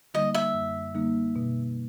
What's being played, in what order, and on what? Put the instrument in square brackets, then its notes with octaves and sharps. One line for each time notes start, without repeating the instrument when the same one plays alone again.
[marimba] D3 G3 A#3 D#4 [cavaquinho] D#5
[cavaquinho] E5
[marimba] F#2
D3 G3 A#3 D#4
B2